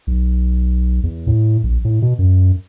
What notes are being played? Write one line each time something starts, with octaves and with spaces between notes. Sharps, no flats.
B1
E2
A2
A#1
A2
B2
F#2